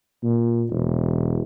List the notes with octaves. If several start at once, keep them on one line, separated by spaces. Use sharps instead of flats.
A#2
E1